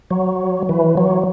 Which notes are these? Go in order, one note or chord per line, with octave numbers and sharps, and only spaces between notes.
F#3
E3
F#3